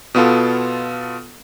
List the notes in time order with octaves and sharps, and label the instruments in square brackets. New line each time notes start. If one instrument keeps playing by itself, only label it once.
[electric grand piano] B2 B3 F4 A4